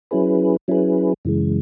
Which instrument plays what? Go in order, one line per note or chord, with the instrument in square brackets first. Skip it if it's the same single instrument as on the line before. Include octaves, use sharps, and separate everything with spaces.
[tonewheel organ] F#3 C#4 E4 G#4 B4
F#3 C#4 E4 G#4 B4
F#2 C#3 E3 G#3